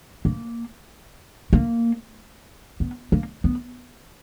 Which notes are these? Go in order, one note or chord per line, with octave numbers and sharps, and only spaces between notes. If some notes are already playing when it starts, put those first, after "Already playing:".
A#3
A#3
B3
A#3
B3